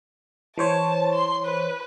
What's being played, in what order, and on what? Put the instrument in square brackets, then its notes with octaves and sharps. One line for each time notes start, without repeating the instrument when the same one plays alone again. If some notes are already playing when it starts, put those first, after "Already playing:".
[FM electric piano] E3 C5 C#5 [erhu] A5
[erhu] C6
B4